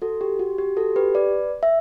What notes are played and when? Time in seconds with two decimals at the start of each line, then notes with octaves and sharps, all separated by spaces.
0.02 F#4 A4
0.21 G4
0.39 F#4
0.58 G4
0.77 F#4 A4
0.96 G4 B4
1.15 B4 D5
1.63 E5